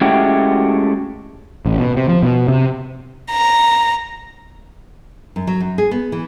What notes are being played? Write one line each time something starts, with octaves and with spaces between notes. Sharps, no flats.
G#3 A3 C#4 E4 F#4 G4
A1
B2
C3
F3
B2
C3
A#5
F#2
F#3
F#2
G#4
B3
E3